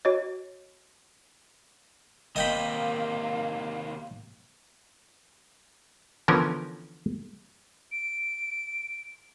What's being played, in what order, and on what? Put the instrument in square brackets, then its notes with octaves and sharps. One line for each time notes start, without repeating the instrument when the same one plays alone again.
[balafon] F#4 C#5 D#5
[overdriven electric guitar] C3 D#3 [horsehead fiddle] A#3 [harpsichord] D#5 G5 B5 [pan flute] F5
[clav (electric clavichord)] D3 E3 F3 B3 C#4 A#4
[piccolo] D7